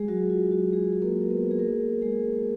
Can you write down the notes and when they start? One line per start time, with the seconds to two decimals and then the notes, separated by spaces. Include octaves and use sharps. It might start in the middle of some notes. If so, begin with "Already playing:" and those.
Already playing: G#3 G#4
0.08 F#3 F#4
0.30 F4
0.51 F#3 F#4
0.73 G#3 G#4
0.92 G#4
1.02 A#3 A#4
1.22 A#4
1.30 B3 B4
1.51 G#4
1.59 A#3 A#4
2.02 G#3 G#4